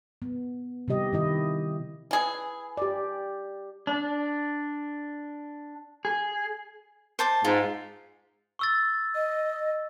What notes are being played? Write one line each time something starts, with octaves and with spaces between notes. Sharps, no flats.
B3
C3 E3 G3 G4 D#5
D#3 E4 D#5
E3 G#4
G4 D5
D4
G#4
C5 A5 D6
G#2 F4
C#6 E6 A6
D#5